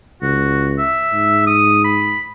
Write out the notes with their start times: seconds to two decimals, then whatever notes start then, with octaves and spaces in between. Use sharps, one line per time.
0.22 C#2 F#4
0.78 E5
1.13 G#2
1.47 D#6
1.84 B5